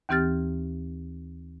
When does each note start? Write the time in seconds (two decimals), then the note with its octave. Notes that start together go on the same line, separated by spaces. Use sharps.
0.09 D#2 E3 C4 G4 F6 A6